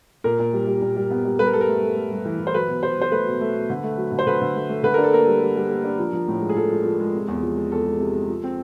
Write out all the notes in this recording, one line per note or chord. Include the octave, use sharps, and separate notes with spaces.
A#2 A#4
A#2
G3
G3
A#2
G3
B3
G3
G2 B4
A#4
G2 A4
A#4
A3
A3
A3
G2
E3
E3
C5
F#3 B4
B2
F#3 C5
F#3 C5
A3 B4
B2
A3
B2
D3
A3
F#3
D3
C5
D3 B4
D3
A3
A3
D3 B4
D4 A#4
A4
A#3 A#4
G3
G3
G3
A#3
D4
F3
F3
A2
G#3
G#4
F3 A4
F3
F3
G#3
C3
E2
F3
G#3
E2 A4
G#3
C3
G#3
F3
C4